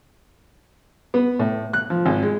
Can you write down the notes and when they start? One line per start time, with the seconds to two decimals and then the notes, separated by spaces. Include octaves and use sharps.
1.14 B3
1.39 A2
1.73 F#6
1.90 F3
2.06 G#1
2.23 G#3